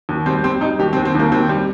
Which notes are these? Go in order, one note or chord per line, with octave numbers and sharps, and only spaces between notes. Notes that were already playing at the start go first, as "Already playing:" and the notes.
D#2
G3 C4
G3 C4
G3 D#4
D#2 G4
C4
D#2
C4
D#2 A#3
D#2 C4
G3